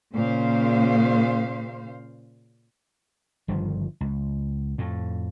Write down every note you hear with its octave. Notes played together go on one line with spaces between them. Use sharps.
A#2 C#3 C5 F5
G1 G2 D#3 F3
C#2
F2 A2